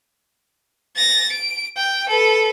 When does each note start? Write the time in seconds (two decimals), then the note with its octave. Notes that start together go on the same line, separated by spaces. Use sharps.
0.96 A6 A#6
1.31 D7
1.76 G5
2.08 A4 B4